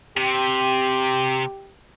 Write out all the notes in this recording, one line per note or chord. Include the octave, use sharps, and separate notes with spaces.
C3 G4